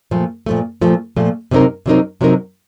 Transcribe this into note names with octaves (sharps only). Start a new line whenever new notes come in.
A#2 F3 A3
A#2 F3 A3
A#2 F3 A3
A#2 F3 A3
C3 F#3 C4 D#4 A#4
C3 F#3 C4 D#4 A#4
C3 F#3 C4 D#4 A#4